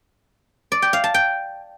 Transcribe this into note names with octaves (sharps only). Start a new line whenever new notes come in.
D5
G5
F5
A5
G5